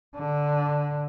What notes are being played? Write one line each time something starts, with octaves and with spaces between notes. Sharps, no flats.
D3